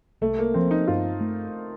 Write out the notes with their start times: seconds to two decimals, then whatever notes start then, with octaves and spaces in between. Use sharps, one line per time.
0.21 C2 A3
0.39 A#3
0.54 F3 C4
0.71 D#4
0.88 G2 F4
1.20 A3